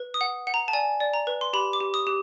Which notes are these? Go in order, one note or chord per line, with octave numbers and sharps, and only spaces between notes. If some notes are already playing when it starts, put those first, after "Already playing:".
Already playing: B4
D#6
F#5
F#5
A#5
A5
D5 G#5
D5
A#5
B4
C6
G4 B5
D6
G4
D#6
G4